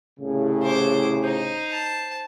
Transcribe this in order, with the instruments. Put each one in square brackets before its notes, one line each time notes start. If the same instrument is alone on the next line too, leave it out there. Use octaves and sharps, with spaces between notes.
[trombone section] C2 A2 C#3
[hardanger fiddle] C5 D6
[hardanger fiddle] D#4 [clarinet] C5
[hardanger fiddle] A5